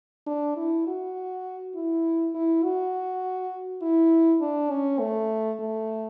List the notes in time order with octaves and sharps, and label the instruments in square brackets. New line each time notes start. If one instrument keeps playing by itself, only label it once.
[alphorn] D4
E4
F#4
E4
E4
F#4
E4
D4
C#4
A3
A3